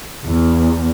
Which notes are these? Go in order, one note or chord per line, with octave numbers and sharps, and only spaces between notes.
E2